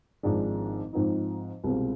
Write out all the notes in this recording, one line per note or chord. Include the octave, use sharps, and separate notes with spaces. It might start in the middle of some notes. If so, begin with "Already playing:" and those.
G#1 G#2 F3 G#3 D4
G#2 F3 C4 D#4
C2 B2 G#3 C4 F4